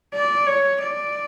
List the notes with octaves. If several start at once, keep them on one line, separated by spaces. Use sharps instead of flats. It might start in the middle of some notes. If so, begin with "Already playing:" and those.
D5
C#5
D5